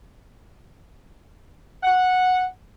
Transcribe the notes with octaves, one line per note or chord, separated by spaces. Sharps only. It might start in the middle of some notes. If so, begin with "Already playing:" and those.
F#5